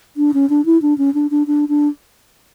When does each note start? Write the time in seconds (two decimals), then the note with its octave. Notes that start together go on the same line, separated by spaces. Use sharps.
0.17 D4
0.34 C#4
0.50 D4
0.66 E4
0.82 D4
0.98 C#4
1.14 D4
1.31 D4
1.47 D4
1.69 D4